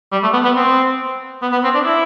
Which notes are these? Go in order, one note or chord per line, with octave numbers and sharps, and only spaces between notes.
G3
A3
B3
B3
C4
B3
B3
C4
D4
E4